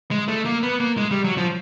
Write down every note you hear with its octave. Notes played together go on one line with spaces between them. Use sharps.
G#3
A3
A#3
B3
A#3
G#3
G3
F#3
F3